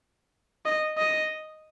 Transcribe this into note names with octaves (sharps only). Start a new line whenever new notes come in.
D#5
D#5